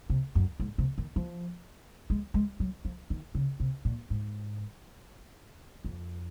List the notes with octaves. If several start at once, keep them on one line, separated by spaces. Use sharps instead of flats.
C3
F#2
G#2
C3
D#3
F3
G#3
G#3
F#3
F3
D#3
C#3
C3
A#2
G#2
F2